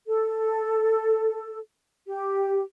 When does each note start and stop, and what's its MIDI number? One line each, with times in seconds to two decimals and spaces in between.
0.07 1.57 69
2.07 2.61 67